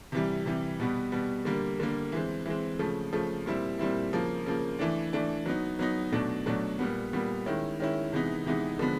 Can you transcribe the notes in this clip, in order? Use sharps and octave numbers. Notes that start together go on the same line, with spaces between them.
C3 E3 G3
C3 E3 G3
B2 G3 B3
B2 G3 B3
D3 G3 A#3
D3 G3 A#3
E3 G#3 C4
E3 G#3 C4
C#3 F3 A3
C#3 F3 A3
A#2 G3 C4 E4
A#2 G3 C4 E4
C#3 F3 A#3
C#3 F3 A#3
E3 A3 D4
E3 A3 D4
F#3 B3 D#4
F#3 B3 D#4
B2 F#3 A3 D4
B2 F#3 A3 D4
A#2 G3 B3
A#2 G3 B3
D#3 G#3 C#4 E4
D#3 G#3 C#4 E4
C3 E3 G#3 B3 D#4
C3 E3 G#3 B3 D#4
D3 F3 G#3 B3